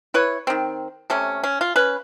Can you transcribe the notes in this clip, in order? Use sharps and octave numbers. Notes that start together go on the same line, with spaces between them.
E4 B4 C#5
D#3 C4
C3 A3 C#4
C#4
F4
C#4 B4